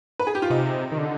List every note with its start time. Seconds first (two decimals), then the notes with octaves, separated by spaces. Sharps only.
0.19 B4
0.27 G#4
0.35 G4
0.42 F4
0.50 C3 D#4
0.92 D#3
0.98 D3